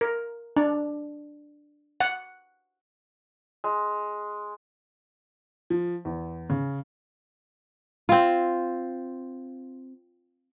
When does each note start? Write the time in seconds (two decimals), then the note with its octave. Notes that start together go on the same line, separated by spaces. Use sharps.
0.01 A#4
0.56 D4
2.00 F#5
3.64 G#3
5.70 F3
6.05 E2
6.50 C#3
8.09 C4 F4